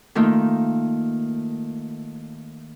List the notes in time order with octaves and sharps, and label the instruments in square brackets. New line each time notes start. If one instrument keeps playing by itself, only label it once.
[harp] D#3 A3 A#3 D#4 F4